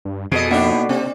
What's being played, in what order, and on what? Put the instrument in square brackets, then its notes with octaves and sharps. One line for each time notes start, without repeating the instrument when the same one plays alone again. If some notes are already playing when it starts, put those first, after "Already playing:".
[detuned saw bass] G2
[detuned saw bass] F2 [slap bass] B2 [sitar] G#4 A4 D#5
[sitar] A2 D4 D#4 [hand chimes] A#3 A4 F#5
[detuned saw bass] C3 [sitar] C4